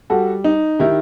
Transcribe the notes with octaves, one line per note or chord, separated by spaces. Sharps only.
G3 F#4 A4
D#4
D#3 E4 G4